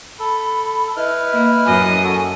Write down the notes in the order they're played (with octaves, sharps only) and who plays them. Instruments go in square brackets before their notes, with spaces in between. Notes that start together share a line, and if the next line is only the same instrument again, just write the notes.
[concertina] A4 [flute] B5
[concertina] E4 B4 F6 [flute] D#5
[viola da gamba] A#3
[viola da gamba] F#2 D#5 [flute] G#5
[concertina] F#4 A4